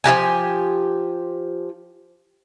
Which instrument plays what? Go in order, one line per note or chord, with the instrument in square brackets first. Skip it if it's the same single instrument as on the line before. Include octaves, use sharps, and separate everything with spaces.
[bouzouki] F3 F4 G4 G#5